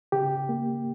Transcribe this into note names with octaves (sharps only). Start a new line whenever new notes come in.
C#3 G4
A#3